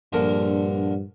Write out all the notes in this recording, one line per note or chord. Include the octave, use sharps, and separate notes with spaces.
A#1 G2 D3 A#4